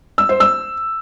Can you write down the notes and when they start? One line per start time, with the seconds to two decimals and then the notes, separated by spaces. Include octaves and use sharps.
0.18 E6
0.29 C5
0.40 E6